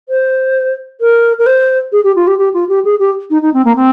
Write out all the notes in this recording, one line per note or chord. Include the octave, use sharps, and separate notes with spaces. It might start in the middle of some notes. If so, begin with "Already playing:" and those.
C5
A#4
A#4
C5
G#4
G4
F4
G4
G4
F4
G4
G#4
G4
D#4
D#4
C4
A#3
C4